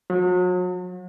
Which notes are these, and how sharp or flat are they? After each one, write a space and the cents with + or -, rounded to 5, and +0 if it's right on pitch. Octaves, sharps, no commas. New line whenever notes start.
F#3 -40